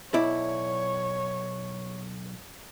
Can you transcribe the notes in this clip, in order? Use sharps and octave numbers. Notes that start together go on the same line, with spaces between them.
B1 E4 C#5 D5